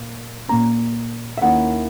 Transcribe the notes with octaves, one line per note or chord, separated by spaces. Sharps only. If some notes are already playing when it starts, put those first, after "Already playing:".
Already playing: A#2 A#3
A#2 A#3 C#4 A#5
E5
D#2 D#3 A#3 C#4 E4 F#5